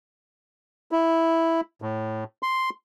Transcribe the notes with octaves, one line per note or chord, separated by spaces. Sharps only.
E4
A2
C6